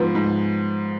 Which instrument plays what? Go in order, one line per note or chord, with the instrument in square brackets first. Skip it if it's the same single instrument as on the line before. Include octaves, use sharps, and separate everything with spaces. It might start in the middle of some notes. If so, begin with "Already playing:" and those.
Already playing: [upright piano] G#2 F3 B3
G#2